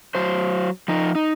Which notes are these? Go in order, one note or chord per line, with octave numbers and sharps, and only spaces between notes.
F#3 C5
F3 D#4
D#4